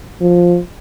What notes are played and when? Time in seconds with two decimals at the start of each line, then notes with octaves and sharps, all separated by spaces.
0.21 F3